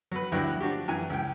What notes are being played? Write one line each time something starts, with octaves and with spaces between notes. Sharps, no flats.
F#3 B4
D2 G2 F#3 E4 G5 F#6
F3 D4 F#4 G4
F#2 E3 G#5
C#2 G5